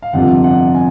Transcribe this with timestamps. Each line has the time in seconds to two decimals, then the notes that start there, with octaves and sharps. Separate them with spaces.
0.02 F5
0.13 G1 F2 C3 F3 F#5
0.44 F#5
0.74 G#5